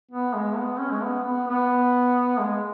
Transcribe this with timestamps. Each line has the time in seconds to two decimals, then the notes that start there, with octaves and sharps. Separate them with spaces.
0.12 B3
0.34 G#3
0.56 B3
0.79 C#4
0.91 G#3
1.02 B3
1.25 B3
1.48 B3
2.38 G#3